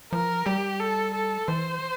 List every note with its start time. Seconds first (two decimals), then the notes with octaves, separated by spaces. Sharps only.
0.12 F3 A#4
0.46 G3 G4
0.80 A4
1.14 A4
1.48 E3 C5